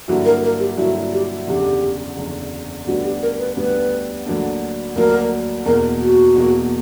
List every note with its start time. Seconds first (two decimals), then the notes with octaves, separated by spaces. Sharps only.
0.08 G2 D3 F#3 A#3 E4 F#4
0.25 A#4
0.44 A#4
0.60 G4
0.77 G2 D3 F#3 A#3 E4 F#4
1.12 G4
1.47 F#1 E2 D3 G4
2.17 F#1 E2 D3
2.87 D2 D3 G3 B3 D4 F#4
3.05 G4
3.22 A#4
3.39 B4
3.57 D2 D3 G3 B3 D4 B4
4.26 D2 D3 F#3 A#3 D4
4.96 D2 D3 F#3 A#3 D4 A#4
5.66 E2 B2 A#3 A#4
6.01 F#4
6.35 E2 B2 A#3